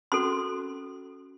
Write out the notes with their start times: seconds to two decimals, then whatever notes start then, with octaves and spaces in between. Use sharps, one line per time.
0.12 C#4 F#4 A4 C6